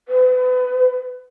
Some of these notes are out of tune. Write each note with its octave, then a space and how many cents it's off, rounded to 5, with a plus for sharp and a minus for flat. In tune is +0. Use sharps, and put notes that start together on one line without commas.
B4 +35